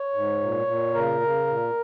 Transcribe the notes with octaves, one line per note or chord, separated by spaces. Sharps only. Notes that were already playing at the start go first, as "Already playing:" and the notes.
Already playing: C#5
G#2
A#2
A#2
C#3 A#4
C#3
A#2